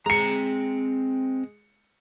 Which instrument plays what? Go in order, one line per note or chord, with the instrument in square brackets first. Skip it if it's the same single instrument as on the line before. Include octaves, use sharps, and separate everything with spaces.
[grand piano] G#3 C#7 [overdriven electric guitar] C4 A#5